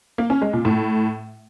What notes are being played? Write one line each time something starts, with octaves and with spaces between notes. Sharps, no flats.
A#3
C#4
G#3
A#2
A2